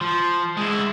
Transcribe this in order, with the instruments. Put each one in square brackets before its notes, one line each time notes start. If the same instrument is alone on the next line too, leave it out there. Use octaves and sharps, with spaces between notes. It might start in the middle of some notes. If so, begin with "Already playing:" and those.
[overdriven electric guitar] F3
G#3 E4